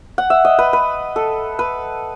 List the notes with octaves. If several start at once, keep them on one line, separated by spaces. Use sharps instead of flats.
F#5
E5
D#5
B4
B4
A4
B4